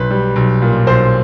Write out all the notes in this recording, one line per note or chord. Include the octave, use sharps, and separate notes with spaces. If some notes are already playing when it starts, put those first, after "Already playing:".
Already playing: B1 B4
G3
B1
A#2
B1 C5